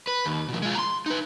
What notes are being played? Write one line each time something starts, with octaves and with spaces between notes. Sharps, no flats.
B4
D#2
B2 F3
G#3 F4
A#5 C6
D#4 B4